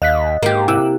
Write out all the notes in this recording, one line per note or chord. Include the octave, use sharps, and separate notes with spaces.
D#2 D#5 F5 F#6 B6
G#2 A#3 G4 A#4
C3 E4 D6 E6 F#6